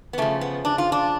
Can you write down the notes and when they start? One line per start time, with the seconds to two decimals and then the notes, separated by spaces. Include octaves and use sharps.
0.13 B3
0.18 C#3 F3 A3
0.41 B3
0.65 D4
0.78 F4
0.92 D4